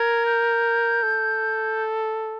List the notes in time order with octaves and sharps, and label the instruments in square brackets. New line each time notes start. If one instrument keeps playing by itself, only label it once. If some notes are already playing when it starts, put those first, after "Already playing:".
Already playing: [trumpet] A#4 [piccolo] G#6
[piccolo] G6
[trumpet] A4